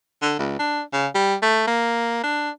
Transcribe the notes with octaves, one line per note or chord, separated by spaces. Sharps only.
D3
C#2
D4
C#3
G3
A3
A#3
D4